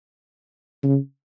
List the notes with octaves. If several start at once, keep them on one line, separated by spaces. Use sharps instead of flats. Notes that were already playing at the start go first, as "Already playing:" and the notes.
C#3